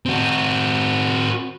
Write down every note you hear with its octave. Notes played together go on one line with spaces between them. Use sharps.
C4 F#4